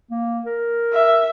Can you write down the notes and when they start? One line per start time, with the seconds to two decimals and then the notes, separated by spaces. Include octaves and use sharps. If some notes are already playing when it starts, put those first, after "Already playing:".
0.10 A#3
0.46 A#4
0.93 E5